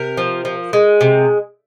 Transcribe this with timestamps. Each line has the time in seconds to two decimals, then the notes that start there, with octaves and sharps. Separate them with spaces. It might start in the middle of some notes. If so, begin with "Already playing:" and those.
Already playing: C3 A#4
0.17 F3
0.45 F3
0.73 G#3
1.01 C3